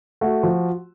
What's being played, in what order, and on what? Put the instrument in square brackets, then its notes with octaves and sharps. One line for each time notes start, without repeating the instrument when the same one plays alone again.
[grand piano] A3 F#4
F3